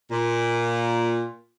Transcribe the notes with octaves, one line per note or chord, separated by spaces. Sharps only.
A#2